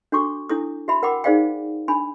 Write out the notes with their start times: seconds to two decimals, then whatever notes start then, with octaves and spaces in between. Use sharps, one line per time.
0.12 D4 F#4 A4 C#6 D6
0.49 D4 E4 A4 D#6
0.88 F#4 E5 B5
1.03 A#4 F#5 G5 B5 D6
1.24 D#4 G#4 C5 D5 F5 G5
1.88 D4 G#5 B5